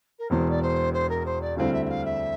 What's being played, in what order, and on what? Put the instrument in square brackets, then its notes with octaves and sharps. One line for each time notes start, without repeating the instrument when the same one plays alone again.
[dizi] A#4
[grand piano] E1 E2 E3 [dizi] C5
[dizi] D5
C5
C5
A#4
C5
D5
[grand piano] D2 D3 G3 C4 E4 [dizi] F5
[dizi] E5
E5
F5
E5